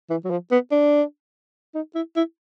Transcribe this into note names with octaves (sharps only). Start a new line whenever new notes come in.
E3
F#3
F3
B3
D4
D#4
E4
E4